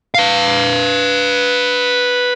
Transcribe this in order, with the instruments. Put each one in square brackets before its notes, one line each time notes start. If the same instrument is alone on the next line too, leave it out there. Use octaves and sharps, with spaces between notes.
[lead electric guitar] B4 F5